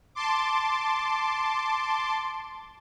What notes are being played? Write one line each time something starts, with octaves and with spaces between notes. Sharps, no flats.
A5 C6 D6